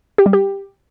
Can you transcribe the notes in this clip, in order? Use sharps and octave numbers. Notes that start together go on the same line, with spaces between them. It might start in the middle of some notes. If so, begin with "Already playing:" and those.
G4
G3
G4